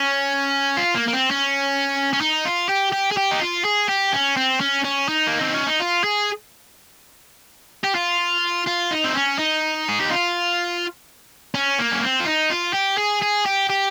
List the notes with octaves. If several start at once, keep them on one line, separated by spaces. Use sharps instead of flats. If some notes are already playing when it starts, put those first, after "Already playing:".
Already playing: C#4
F4
A#3
A#3
C4
C#4
C#4
D#4
F4
G4
G4
G#4
G4
D#4
F4
G#4
G4
C#4
C4
C#4
C#4
D#4
A#3
C4
C#4
D#4
F4
G#4
G4
F4
F4
D#4
C4
C#4
D#4
G#4
G4
F4
C#4
A#3
C#4
C4
F4
D#4
F4
G4
G#4
G#4
G4
G4